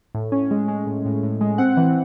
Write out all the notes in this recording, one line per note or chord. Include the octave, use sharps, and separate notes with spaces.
A2
C#4
G#3
G#3
A2
A2
A2
G#3
C4 F#5
E3